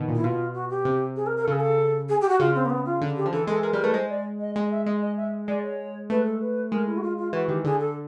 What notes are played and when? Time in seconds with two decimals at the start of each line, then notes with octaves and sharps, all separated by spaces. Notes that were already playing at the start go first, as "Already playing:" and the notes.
Already playing: B2 D#3
0.08 A#2
0.15 E4
0.24 B2 F4
0.54 F#4
0.70 G4
0.85 C3
1.16 G#4
1.26 A#4
1.37 A#4
1.44 A4
1.47 C#3 G#4
1.60 A4
2.09 G#4
2.21 G4
2.29 F#4
2.40 C#3 F4
2.55 C4
2.66 A#3
2.70 B3
2.86 F4
3.01 D3
3.16 G4
3.25 F3
3.32 E3 A4
3.47 G#3 A4
3.63 G#3 A#4
3.73 G3 A#4
3.84 A3 B4
3.94 G#3 C5
4.09 D5
4.40 D#5
4.56 G#3 D#5
4.71 E5
4.86 G#3 D#5
5.02 D#5
5.17 E5
5.48 G#3 D5
5.63 C#5
6.10 A3 B4
6.25 A4
6.41 B4
6.72 G#3 A#4
6.86 E4
6.98 F#4
7.03 F4
7.18 F4
7.33 E3 F#4
7.48 D#3 G4
7.64 D3 G#4
7.80 A4